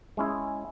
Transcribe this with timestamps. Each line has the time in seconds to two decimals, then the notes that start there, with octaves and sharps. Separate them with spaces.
0.17 G#3 C#4 E4 G#4